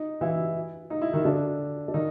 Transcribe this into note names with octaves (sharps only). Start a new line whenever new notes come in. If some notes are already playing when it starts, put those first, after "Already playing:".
Already playing: D#4
E3 E4
D#4
E4
D#3 D#4
D3 D4
D4
D#3 D#4